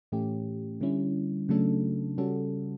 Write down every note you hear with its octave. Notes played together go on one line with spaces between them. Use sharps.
A2 E3 A3 C#4 G4
D3 G3 C#4 E4
C#3 F#3 A3 D4 A4
C#3 G3 C#4 F#4 A4